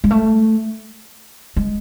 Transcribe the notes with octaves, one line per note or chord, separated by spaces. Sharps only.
G#3
A3
G#3